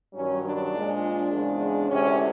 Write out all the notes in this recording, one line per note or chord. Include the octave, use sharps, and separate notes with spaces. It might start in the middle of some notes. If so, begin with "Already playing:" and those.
G2 D#3 F#3 C#4
D4
A#2 F3 G#3
D4
E2 C#3 F3 G#3
D2 C3 E3 G#3 C#4